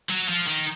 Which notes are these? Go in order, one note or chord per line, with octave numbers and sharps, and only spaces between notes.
F#3
F3
D#3